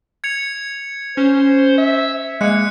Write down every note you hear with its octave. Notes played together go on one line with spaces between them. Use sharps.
G#6 C#7 F7
C#4 C5
E5
G#3 A#3 F#6 C#7